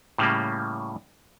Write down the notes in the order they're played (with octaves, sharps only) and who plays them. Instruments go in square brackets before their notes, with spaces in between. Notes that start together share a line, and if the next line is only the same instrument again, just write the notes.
[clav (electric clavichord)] A2 C#3 G3 A#3